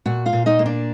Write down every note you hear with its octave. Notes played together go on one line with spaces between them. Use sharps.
A#2 F#4 F#5
F4 F5
A#2
D#4 D#5
A#3
D4 D5